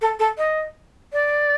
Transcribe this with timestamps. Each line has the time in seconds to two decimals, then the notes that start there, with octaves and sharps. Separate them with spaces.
0.02 A4
0.19 A4
0.38 D#5
1.13 D5